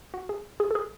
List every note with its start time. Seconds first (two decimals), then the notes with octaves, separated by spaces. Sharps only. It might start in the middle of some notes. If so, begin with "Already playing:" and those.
0.14 F#4
0.29 G#4
0.60 G#4
0.71 A4
0.75 G#4